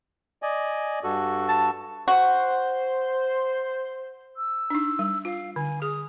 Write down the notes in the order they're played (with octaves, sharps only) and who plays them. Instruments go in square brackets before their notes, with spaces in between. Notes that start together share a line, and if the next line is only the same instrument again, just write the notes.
[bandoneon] D5 D#5 G#5
G2 F#4 A4
[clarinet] A5
[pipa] F#4 [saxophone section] C5
[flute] E6
[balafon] D4 D#4
G3
[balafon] F4 [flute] F5
[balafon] D3 [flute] G#5
[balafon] G#4 [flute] D#6